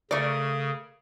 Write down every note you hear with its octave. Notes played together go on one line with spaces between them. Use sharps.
C#3 A3 A#4 D5 D#6